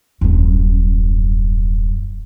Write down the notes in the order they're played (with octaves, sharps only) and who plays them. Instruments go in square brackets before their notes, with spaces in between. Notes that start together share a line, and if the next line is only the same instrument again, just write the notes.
[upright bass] D#1 F#2